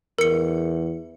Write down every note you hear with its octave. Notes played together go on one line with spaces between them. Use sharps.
E2 A#4 C#7